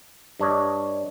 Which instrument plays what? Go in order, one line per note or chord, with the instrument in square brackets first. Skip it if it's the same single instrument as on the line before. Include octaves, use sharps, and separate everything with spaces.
[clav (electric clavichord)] G2 D4 C#5 D#5